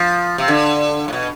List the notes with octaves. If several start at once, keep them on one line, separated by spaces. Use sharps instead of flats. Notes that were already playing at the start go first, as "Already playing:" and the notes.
Already playing: F3
C3
D3
A2
B2